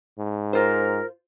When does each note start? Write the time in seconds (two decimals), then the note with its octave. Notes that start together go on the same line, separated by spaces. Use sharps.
0.19 G#2
0.53 F4 A#4 C5